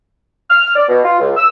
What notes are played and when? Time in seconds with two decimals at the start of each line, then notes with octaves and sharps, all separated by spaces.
0.50 F6
0.76 D5
0.89 B2
1.05 F4
1.20 C#2
1.36 E6